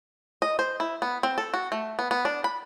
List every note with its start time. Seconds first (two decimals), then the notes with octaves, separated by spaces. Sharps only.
0.42 D#5
0.59 C5
0.80 E4
1.02 B3
1.23 C4
1.38 A4
1.54 F#4
1.72 A3
1.99 B3
2.11 B3
2.25 D4
2.44 B5